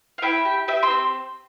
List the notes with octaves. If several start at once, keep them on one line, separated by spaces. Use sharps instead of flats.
F5
E4 E5 G5
G4
G4 E5 G5
C6 E6
C4